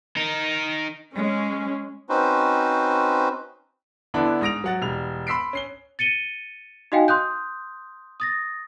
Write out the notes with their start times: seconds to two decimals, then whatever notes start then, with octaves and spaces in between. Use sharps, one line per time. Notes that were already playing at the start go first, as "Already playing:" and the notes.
0.17 D#4 A#4
1.15 G#3 C#4
2.09 C4 C#4 D#4 F#4 B4 C5
4.14 D3 B3 D4 E4 A4
4.41 G#2 D#6 A#6 D7 F7
4.64 F#3 F#5 A6
4.82 E1 G3 F7
5.27 B5 C6 E6 B6 C7 D7
5.53 C#4 C7 G7
5.99 A6 C#7 D#7 G7
6.92 D#4 F#4 D#5 F5 G5 G#5
7.08 C6 D#6 F#6 G6
8.20 D#6 A6 A#6